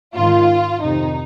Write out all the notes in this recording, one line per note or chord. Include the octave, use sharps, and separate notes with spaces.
G#2 D#3 F4
F2 C3 D#3 D#4